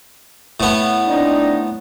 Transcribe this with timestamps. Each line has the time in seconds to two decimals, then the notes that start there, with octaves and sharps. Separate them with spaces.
0.60 A2 B3
1.08 C4 D4 D#4